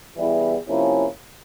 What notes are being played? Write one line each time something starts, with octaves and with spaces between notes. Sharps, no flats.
E3 G3 B3 E4 G#4
C3 F3 A#3 C#4 E4